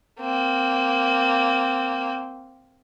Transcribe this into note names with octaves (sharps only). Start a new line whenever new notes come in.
A#3 C4